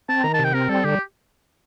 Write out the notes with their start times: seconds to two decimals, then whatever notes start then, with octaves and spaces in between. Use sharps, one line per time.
0.09 C4 A5
0.24 D#3 A#5
0.34 A5
0.39 C3
0.44 G5
0.54 C4 A#4
0.69 G3 A4
0.84 D3 G4